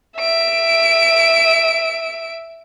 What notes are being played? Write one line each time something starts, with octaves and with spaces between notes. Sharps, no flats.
E5 D7